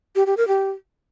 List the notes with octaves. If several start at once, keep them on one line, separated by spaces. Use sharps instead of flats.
G4
G4
A#4
G4